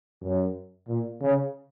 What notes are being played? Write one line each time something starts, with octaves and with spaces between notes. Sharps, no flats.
F#2
A#2
C#3